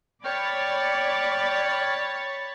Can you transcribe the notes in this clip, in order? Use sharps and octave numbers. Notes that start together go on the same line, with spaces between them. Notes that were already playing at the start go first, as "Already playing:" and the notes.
C#5 D5 G5 B5 C#6 F6 A6